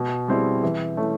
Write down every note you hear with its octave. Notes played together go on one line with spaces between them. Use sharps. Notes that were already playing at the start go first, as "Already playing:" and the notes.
Already playing: B2
G3 C4 E4 G#4
E3
A3 C#4 E4